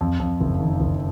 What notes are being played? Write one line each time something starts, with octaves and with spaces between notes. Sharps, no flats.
F2
F2
F#1
D#3
F#1